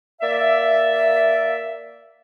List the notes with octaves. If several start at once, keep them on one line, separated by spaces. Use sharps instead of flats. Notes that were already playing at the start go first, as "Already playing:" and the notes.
A#3 D5 E5